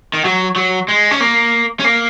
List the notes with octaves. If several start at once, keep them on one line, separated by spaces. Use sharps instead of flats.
D#3
F#3
F#3
G#3
C#4
A#3
C#4
A#3